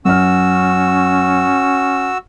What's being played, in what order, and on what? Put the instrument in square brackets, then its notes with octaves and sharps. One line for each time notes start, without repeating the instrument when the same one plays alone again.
[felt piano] F#2 F6 [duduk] C#4 [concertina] F#4 E6